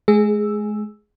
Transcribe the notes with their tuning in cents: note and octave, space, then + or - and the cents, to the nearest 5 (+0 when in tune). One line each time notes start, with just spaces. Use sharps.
G#3 +35 G#4 +0 E6 +0